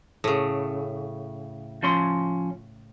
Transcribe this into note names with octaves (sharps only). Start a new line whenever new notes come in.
A2 C#3
F3 C#4 C6